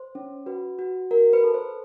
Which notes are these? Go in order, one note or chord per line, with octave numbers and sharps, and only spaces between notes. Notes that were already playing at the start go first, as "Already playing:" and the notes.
Already playing: C5
C#4
F#4 B4
F#4
F#4 A#4
B4
A4
C5